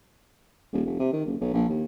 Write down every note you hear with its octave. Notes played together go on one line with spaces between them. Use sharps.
D#1
F1
C3
D#3
F#1
B1
A#1
D#2